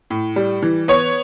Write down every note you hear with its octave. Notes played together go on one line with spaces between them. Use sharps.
A2
G3
E3
B3 C#5